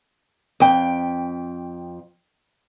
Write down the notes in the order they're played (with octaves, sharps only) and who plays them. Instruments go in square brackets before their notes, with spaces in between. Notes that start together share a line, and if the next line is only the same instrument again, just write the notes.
[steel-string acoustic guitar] F2 G5